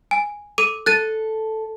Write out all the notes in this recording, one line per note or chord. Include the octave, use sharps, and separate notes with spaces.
G#5
A4 D6 D#7
A4 F#6 A6 D#7